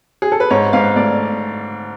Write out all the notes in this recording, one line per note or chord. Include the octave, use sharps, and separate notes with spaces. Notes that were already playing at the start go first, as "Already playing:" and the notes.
G#4
A4
B4
G#2 C#5
G#2 F5
A3 D5